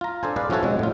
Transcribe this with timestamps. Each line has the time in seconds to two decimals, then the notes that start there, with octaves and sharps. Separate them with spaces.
0.01 F4 A#5
0.23 D4 A4 C5 G#5
0.36 G#4 B4 D5 F5
0.50 F3 C#4 E4 F#4 A4 C#5
0.63 C3 F#3 G#3 D4
0.79 A2 F4